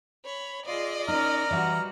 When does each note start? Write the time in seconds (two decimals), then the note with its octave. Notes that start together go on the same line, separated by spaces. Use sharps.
0.25 C#5 B5
0.66 F4 G#4 D5 D#5
1.08 C#4 D#4 A#4 A#5 F6
1.51 E3 G3 F#4 E5 F#5